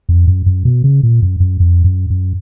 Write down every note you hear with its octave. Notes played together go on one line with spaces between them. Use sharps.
F2
F#2
F#2
B2
C#3
A#2
F#2
F#2
F2
F#2
F#2